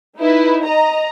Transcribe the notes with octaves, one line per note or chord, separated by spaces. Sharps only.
D#4 E4 B4
D#5 A#5